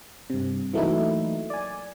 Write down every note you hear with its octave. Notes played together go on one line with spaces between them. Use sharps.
G2 C3
E3 F#3 A3 A#3 D#4 E4
D5 G#5